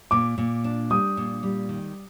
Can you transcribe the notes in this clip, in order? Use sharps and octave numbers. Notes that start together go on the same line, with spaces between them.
A#2 D6
A#2
D4
G3 D#6
A#2
G3
D#3